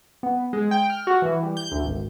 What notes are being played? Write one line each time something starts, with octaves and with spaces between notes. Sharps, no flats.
B3
G#3
G5
F6
F#4
E3
G3
G6
D2
G#1